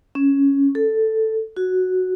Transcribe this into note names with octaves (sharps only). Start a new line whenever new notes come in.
C#4
A4
F#4